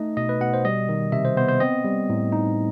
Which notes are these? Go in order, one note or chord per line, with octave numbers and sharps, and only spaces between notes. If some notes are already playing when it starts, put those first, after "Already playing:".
Already playing: A3 D#4 D#5
B2 D#5
B4
B2 F#5
C5
G3 D#5
D#3
C3 E5
C5
B3 C5
C5
C4 D#5
G3
A2
D#4